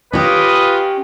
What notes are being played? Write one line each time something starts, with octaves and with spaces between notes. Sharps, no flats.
C#4 F4 G4 B4 D#5